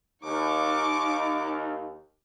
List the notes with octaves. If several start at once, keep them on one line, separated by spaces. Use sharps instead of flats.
D#2 D#4 C#6 D6